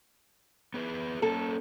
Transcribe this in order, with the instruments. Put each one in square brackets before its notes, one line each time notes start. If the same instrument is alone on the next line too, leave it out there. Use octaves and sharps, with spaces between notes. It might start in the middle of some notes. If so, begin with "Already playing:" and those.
[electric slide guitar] B3 G#4 B4
[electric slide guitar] A#3 C#4 [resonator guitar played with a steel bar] A4